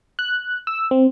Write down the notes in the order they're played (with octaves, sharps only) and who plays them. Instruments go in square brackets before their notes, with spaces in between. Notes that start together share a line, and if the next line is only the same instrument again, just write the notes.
[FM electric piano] F#6
E6
C4